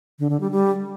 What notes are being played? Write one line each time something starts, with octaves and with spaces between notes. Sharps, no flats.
D3
D3
G3
G3